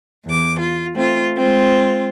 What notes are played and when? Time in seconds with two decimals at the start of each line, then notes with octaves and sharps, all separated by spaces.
0.24 E2 D6
0.58 F4
0.94 A3 C4 F4
1.36 G#3 C4 F4